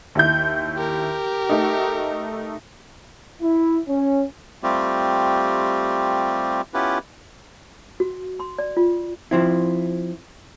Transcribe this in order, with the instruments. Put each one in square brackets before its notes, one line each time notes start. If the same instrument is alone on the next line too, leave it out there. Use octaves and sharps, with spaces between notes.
[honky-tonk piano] D#2 E4 G6
[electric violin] G4 A#4
[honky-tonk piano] A3 D#4
[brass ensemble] E4
C#4
[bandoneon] G3 A3 C4 F4 G4
B3 C#4 E4 F4 G4 B4
[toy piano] F#4
C6
D5
F4
[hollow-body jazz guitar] F3 C4 E4